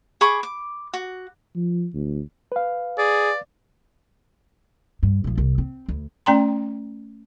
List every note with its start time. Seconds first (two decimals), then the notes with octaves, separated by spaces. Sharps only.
0.21 G#4 B5 C#6 D6
0.43 D6
0.93 F#4
1.56 F3
1.94 D2
2.52 B4 F5
2.98 G#4 D5
5.03 G2
5.24 B1 F3
5.38 C2
5.58 C4
5.89 D2
6.26 A3 C#4 D5 G5 A#5 C6